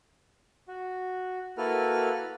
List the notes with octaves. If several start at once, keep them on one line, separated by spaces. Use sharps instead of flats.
F#4
A#3 E4 F#4 A4 B4 F6